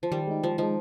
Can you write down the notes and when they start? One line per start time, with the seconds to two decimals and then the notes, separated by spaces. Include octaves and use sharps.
0.03 F3
0.12 D#3 G3
0.27 G#3 D#4
0.43 D#3 F3
0.58 F3 G#3 D#4